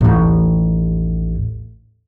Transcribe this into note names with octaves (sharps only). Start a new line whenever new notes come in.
A1 D#2